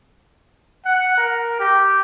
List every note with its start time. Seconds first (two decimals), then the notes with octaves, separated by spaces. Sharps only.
0.85 F#5
1.17 A#4
1.60 G4